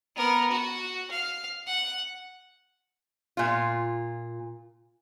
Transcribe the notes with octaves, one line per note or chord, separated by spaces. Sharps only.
B3 A#4
F#4
F5
F#5
A#2 F4